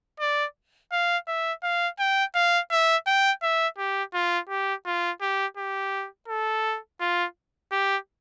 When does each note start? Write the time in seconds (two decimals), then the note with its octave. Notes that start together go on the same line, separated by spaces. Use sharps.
0.20 D5
0.92 F5
1.27 E5
1.63 F5
1.99 G5
2.35 F5
2.71 E5
3.07 G5
3.42 E5
3.78 G4
4.14 F4
4.49 G4
4.86 F4
5.21 G4
5.57 G4
6.28 A4
7.01 F4
7.72 G4